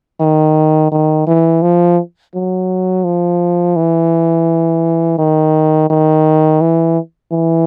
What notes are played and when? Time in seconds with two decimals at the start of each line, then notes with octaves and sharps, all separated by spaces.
0.20 D#3
0.92 D#3
1.27 E3
1.62 F3
2.34 F#3
3.04 F3
3.76 E3
5.18 D#3
5.90 D#3
6.61 E3
7.32 E3